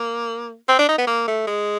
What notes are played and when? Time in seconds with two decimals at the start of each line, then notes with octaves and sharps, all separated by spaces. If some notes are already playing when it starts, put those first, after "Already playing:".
Already playing: A#3
0.68 C4
0.79 D4
0.88 D#4
0.98 B3
1.07 A#3
1.28 A3
1.47 G#3